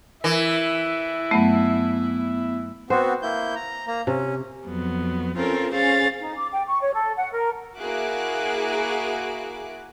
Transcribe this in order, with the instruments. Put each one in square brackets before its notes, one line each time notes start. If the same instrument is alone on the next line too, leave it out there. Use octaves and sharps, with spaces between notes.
[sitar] E3 [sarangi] E4 [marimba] A#4
[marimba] G2 F#3 A3 [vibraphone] B3
[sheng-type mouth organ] B3 C4 F#4 [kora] C5
[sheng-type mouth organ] A#3 E4 G6
A#5
A#3 A#5
[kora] C3 [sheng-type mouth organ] C#4
[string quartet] F2 F#3 B3
C4 C#4 F4 A4 A#4
C#4 G#4 C5 F5 A6
[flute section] D#4
D6
G5
C#6
C#5
A4
F#5
A#4
[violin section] A#3 E4 F#4 G#4 D6 F#6